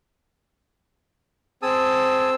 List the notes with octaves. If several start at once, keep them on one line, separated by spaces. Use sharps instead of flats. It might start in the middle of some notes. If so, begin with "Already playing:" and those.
C4 G#4 A5 D#6 E6